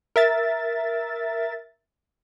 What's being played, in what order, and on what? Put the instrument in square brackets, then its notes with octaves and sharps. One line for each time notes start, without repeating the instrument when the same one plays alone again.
[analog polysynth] A#4 E5 A6